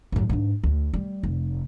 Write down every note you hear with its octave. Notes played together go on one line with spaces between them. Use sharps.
A1 F#2
G#2 D4
D2
G3
F1